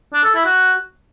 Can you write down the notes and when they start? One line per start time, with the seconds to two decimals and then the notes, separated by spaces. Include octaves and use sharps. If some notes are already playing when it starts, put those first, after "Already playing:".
0.13 D4
0.24 A4
0.35 E4
0.45 F#4